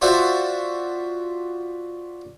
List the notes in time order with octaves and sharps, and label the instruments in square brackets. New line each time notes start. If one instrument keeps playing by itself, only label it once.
[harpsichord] F4 F#4 C5 D5 E5